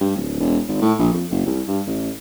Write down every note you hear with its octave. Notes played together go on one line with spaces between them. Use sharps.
G2
D1
E1
G#1
A2
A#1
F2
F#1
C2
G2
A1